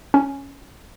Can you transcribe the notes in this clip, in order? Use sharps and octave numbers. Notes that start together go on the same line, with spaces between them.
C#4